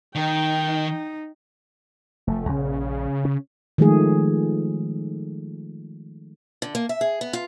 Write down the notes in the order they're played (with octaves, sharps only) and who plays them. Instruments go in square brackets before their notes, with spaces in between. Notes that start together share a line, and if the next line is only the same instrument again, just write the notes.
[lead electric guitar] D#3 [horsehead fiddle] D#4 [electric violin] G5
[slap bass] F1 F3 [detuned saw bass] A3
[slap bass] A#1 [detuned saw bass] C#3
[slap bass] C#4
[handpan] D#3 F3 G#3 A3 G#4
[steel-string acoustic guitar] D3
A#3
E5
G#4
B3
F4